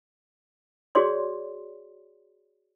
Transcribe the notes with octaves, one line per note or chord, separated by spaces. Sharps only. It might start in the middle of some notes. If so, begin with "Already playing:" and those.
F#4 G#4 C#5 D5 C6